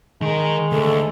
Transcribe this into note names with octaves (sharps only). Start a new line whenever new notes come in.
D#3 G#3 A#4
D2 A4